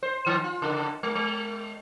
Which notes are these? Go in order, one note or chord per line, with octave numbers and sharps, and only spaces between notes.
C5
D#3
F4
C#3
G#3
G#3